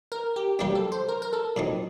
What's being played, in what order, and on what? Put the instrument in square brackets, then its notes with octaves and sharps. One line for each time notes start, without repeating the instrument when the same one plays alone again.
[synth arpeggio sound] A#4
G4
[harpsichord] G2 F#3 A#3 D4 [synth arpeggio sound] G4
[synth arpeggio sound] A4
C5
A#4
A#4
A4
[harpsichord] A#2 F#3 C4 D#4